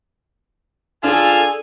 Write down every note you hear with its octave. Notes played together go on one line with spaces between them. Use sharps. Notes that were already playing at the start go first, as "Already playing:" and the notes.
D4 F4 G#4 A4 G#5 A5 F6